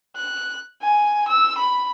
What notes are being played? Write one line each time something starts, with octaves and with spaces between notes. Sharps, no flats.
F#6
G#5
E6
B5